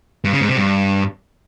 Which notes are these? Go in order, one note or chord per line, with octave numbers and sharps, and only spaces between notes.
G2
C#3
G#2
C3
G2